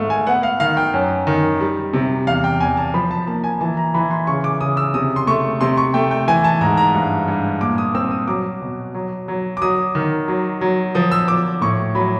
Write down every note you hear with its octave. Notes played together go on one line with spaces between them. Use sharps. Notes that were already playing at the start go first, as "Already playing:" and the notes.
Already playing: G#2 D#3 A3 F5
G#5
B3 F#5
F5
D#3 F5
G5
F#2
D#3
G3
C3
E2 F5
G5
E2 G#5
A5
F3 B5
A5
A#3 A5
G#5
E3 A5
A#5
E3 B5
C6
C#3 C#6
D6
C#3 D#6
E6
C3 D#6
C6
A3 C#6
C3 C6
C#6
A3 G5
G5
E3 G#5
A5
G#2 A#5
A#5
G2
G2
A#2 D6
D#6
C4 E6
D#6
F#3 D6
B2
F#3
F#3
D6
F#3 D#6
D#3
F#3
F#3
F3 D#6
E6
F3 D6
A2 C#6
F#3 B5